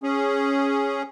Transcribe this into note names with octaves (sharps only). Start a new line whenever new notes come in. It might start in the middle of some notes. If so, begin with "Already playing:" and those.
C#4 G#4